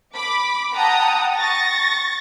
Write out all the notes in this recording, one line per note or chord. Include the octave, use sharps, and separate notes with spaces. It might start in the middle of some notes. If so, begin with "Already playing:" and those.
B5 D6
F#5 G5 A5 A#5 D#6
C#6 A6 A#6